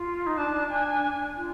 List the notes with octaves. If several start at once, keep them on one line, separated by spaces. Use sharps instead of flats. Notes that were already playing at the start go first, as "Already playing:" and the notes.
Already playing: F4
D#4
D4 A5
D4 G#5
D4
D4
F4